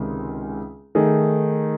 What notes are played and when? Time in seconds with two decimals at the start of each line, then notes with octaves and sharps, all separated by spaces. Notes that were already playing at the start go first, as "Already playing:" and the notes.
Already playing: C#2 C3 D#3 G#3 C#4
0.95 D#3 A3 D#4 G#4